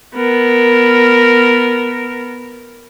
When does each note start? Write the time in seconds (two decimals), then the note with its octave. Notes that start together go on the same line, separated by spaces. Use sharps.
0.15 B3 A#4